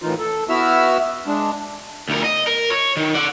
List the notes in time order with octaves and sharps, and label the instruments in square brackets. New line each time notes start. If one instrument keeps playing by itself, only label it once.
[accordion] A2 D#3 E3 D#4 F4
A4
B3 E4 F#4 E5 E6 F6
G#3 D4
[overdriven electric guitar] D2 A#4
D#5
A#4
C#5
D#3
D5 F#5